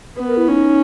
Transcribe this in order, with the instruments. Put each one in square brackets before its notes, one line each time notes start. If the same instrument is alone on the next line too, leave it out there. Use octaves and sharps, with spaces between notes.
[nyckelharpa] B3 [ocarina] B4
[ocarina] A#4
E4
[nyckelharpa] C#4 [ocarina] D#4